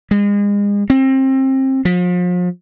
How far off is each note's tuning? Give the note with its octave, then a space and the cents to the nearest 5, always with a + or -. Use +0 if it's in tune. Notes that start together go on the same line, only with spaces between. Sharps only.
G#3 -35
C4 +25
F3 +40